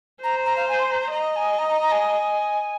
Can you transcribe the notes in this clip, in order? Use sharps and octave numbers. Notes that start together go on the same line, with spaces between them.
C5 A#5
A#5
F5
G#5
C6
A#5
A#5
D#5 A#5
G#5
A#5
A#5
A#5
G#5